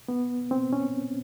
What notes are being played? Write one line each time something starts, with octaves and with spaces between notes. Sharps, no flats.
B3
C4
C#4